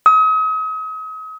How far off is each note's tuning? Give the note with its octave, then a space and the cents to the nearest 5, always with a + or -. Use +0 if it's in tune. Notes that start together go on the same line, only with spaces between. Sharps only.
D#6 +40